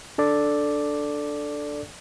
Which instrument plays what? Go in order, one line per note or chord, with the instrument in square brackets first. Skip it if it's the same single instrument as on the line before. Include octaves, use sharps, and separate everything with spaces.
[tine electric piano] D4 A4 D5